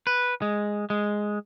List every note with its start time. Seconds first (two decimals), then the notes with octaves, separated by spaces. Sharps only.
0.07 B4
0.42 G#3
0.90 G#3